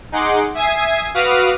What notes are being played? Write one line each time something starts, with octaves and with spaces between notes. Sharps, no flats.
D#4 G#4 F#5 C6 D6
E5 G#5 D#6 G#6 C7
F#4 B4 F5 D6 D#6 F6